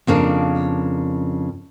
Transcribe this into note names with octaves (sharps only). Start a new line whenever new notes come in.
F2 C#3 A#3 D4